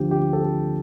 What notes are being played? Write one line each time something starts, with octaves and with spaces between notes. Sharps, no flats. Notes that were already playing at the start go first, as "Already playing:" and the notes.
Already playing: D2 D3 F3 G4
G4
A4